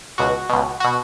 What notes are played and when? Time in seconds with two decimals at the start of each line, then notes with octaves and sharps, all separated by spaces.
0.18 C#2 B2 F#4
0.49 C#2 B2
0.80 B2 F#4